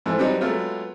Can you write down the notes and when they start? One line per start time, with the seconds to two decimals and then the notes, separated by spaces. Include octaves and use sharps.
0.06 G#2 E3 F3 A3
0.19 F#3 G3 B3 C4 D4 D#4
0.41 F#3 G#3 A3 B3 F4